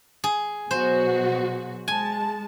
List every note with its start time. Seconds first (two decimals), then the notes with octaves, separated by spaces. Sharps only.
0.24 G#4
0.71 B2 F#3 F#4 C5
1.88 G#3 G#5 A5